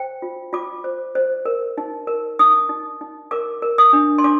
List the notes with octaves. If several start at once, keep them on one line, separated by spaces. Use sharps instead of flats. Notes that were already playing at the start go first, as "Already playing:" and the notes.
Already playing: C5 G5
F4
F4 D6
C5
C5
A#4
D#4
A#4
D#4 D#6
D#4
D#4
A#4 D6
A#4
D#6
D4
C6
D4 D6